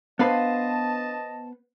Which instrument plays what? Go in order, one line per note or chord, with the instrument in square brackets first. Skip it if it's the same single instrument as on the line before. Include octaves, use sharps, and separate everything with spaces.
[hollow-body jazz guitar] B3 B4 C5 [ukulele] D4 F5 B5 [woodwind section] D#5 A5